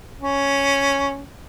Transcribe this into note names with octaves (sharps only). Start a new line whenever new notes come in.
C#4